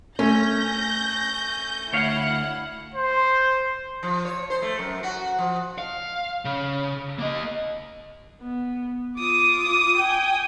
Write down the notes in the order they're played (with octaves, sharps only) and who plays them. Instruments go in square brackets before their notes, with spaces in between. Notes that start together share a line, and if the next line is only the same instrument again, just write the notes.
[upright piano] A3 [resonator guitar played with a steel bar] C#4 [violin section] G6 A#6
[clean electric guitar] D2 C#5 F5 [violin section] E4 F#5
[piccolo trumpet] C5
[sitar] F3
C#5
C5
A3
F#2
F#4
F3
[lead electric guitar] F5
C#3
A#3 D#5
[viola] B3
[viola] F4 D6 [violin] D#6
[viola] G5 G#5